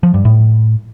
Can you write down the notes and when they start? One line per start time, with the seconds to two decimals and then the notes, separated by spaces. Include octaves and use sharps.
0.03 F3
0.14 G2
0.25 A2